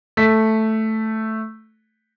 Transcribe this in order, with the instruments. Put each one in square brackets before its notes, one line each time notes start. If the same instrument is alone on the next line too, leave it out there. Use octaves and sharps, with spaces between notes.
[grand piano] A3 B6